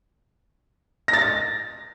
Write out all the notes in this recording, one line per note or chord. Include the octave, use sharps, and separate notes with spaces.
A#6
A6
A#6